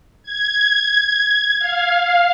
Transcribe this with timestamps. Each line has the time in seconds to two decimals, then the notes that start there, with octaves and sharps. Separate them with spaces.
0.23 G#6
1.59 F5